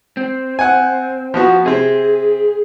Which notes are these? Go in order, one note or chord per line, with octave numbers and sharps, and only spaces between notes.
C4
F#5 G#5
F3 B3 F#4
C3 C4 G#4